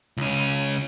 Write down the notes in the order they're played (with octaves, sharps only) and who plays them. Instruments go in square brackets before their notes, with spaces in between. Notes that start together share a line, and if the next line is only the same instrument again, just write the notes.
[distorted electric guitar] C#2 C#4